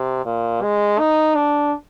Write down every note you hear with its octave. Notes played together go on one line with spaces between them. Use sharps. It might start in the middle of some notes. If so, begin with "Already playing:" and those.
Already playing: C3
A#2
G#3
D#4
D4